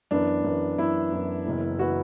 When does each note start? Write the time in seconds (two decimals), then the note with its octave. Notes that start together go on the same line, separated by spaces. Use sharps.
0.11 F#2 E3 B3 D4
0.44 F#2 E3 B3
0.78 F#2 E3 B3 E4
1.12 F#2 E3 B3
1.46 F#1 F#2 E3 B3
1.79 E3 B3 F#4